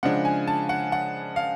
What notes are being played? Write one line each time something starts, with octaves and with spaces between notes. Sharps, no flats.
C#3 F3 G#3 D4 F#5
G#5
A5
F#5
F#5
F5